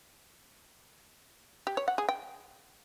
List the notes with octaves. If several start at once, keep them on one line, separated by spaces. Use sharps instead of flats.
G4
C#5
F#5
G#4
G5